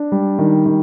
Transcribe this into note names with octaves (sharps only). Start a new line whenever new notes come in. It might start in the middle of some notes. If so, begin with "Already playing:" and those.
Already playing: D4
G3
D#3
D#3